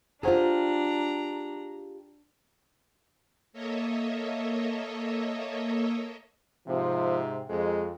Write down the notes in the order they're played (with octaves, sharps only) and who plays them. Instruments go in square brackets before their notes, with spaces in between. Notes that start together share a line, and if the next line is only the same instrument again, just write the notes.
[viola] D4 A#5 [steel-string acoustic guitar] F4 G4 G#4 [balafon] C5 F#5 G#5
[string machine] A#3 A4 C#5 D#5 E5
[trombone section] G#2 C3 [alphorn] F3
[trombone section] F2 [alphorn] G#3